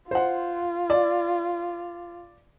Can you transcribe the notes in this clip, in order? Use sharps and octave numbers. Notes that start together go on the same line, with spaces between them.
F4 C5 F#5
D5